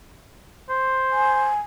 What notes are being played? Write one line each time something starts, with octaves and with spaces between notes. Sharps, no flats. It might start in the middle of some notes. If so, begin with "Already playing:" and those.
C5
G#5